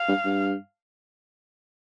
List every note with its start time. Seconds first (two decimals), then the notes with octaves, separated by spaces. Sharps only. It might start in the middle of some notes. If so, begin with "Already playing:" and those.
Already playing: F5
0.08 G2
0.25 G2